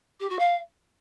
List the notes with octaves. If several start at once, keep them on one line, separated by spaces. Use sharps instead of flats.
G4
F#4
F5